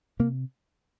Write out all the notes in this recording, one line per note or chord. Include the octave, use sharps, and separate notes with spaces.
C3 A#3